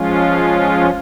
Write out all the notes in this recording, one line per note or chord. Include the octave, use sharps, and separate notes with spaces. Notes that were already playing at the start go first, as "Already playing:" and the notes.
Already playing: F3 G#3 C#4 F4